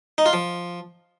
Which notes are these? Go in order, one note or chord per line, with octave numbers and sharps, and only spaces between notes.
D#4
F4
F3